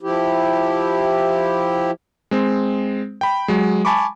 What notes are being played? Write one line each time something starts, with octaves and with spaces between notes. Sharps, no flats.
F3 E4 G4
G#3 C4
G5 B5
F#3 G#3
G#5 A5 B5 C#6 D6